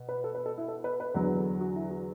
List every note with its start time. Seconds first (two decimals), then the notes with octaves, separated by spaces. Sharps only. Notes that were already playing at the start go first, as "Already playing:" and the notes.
Already playing: B2
0.09 B4
0.24 A4
0.35 B4
0.46 A4
0.58 E4
0.69 A4
0.84 B4
1.00 B4
1.14 E2 D3 F#3 B4
1.38 A4
1.61 F#4
1.76 E4
1.91 F#4